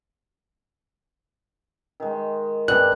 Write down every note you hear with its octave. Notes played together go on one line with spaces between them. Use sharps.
D#3 G#3
G2 G#3 C4 D4 F#6